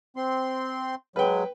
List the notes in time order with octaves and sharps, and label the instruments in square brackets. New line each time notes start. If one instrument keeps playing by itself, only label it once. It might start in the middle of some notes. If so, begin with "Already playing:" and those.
[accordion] C4 C6
[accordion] F#3 G#3 [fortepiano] B4 G5